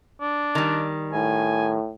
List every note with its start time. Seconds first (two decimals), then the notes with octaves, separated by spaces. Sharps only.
0.21 D4
0.55 D#3 G3
1.13 A2 G#5